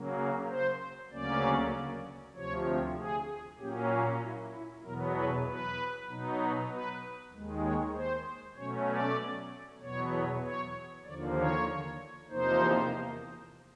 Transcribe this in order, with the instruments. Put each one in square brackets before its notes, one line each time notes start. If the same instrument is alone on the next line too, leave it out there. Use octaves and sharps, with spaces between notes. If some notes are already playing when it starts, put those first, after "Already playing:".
Already playing: [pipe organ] C#3 F#3 A#3
C5
D2 C#3 F#3 A#3 C#4 D5
D2 C3 F3 C#5
G#4
A#2 F#3 A#3 C#4 G4
F#4
E4
E4
E2 B2 F#3 B3 A#4
B4
B4
B2 F#3 B3 D#4
B4
D#2 D#3 G#3
C#5
C5
B2 F#3 A3 C#4 C#5
D5
E2 B2 F#3 B3 C#5
C#5
D#2 D3 F3 A#3 D5
C#5
E2 C3 F3 A#3 D#4 C5